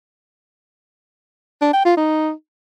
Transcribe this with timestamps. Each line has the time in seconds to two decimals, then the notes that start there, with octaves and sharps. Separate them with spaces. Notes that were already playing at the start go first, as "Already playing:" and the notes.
1.61 D4
1.73 G5
1.85 F4
1.97 D#4